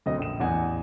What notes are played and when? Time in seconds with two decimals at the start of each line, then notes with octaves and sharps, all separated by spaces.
0.06 D2 F#3 C4 D#5
0.18 A#1 E7
0.40 A1 E2 F#5 G#5